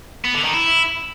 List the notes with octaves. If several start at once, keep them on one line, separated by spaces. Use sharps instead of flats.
B3
D3
D#3
E4